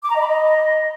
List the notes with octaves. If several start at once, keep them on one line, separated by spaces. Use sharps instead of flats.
D6
A#5
D#5
B5
D#5